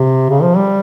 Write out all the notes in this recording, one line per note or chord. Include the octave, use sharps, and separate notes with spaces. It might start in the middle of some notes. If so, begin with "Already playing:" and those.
Already playing: C3
C#3
F3
G3